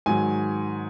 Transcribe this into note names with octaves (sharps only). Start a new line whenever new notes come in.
G#2 D#3 F#3 G#5